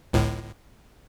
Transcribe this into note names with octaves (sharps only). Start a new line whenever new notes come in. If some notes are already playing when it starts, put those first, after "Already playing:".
G1 C#2 A2